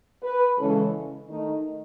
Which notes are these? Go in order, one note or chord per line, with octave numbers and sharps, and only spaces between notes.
B4
C#3 E3 G#3 C#4 A4
D#3 A3 D#4